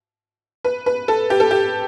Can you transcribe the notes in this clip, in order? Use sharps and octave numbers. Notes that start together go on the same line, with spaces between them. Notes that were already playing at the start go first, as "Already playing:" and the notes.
B4
B4
A4
G4
A4
G4